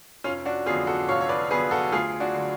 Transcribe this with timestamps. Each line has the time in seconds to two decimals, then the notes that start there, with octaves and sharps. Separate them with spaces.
0.24 F1 C#4 F4
0.45 D4 F#4
0.66 F2 D3 F#3 B3 F4 G#4
0.87 F#4 A4
1.08 F1 C#5 F5
1.21 C#5
1.29 B4 D5
1.50 F2 D3 F#3 B3 G#4 B4
1.71 F#4 A4
1.92 D2 F4 G#4
2.20 D4 F#4
2.34 D3 F#3